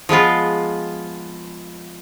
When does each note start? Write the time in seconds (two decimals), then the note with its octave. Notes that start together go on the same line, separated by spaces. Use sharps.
0.09 F3 G#3 B3 F4